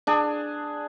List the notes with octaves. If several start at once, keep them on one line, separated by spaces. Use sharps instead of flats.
D4 G#4